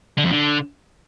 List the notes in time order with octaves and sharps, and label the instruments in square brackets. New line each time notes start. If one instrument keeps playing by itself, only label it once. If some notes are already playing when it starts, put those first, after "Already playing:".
[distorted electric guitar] D3
F2
D3